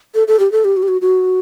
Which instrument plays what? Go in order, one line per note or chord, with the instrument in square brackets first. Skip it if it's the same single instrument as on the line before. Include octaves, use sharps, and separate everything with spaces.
[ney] A4
A4
G4
A4
G4
F#4
G4
F#4
F#4